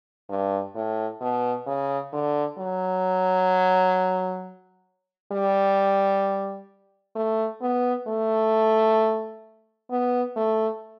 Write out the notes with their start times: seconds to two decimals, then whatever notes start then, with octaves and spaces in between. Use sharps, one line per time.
0.29 G2
0.75 A2
1.21 B2
1.66 C#3
2.12 D3
2.58 F#3
5.32 G3
7.15 A3
7.61 B3
8.07 A3
9.90 B3
10.36 A3